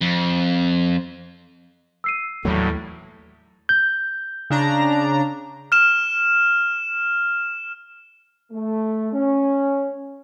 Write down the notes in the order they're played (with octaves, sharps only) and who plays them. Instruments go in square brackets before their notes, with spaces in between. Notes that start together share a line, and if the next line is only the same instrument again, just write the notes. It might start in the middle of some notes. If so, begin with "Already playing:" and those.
[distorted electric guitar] F2
[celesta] E6 C7 D#7
[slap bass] D#2 E3 A3 [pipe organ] A2 G3 [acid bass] F#3
[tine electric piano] G6
[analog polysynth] C#3 D4 A#5
[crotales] F6 E7
[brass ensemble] A3
C#4